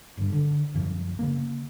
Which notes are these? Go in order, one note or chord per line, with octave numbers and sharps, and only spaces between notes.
G1 G2
D3
C2 F#2 F3
C#3 A#3